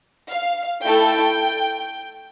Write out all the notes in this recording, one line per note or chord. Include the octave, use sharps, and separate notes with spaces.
F5
A3 E4 A4 G5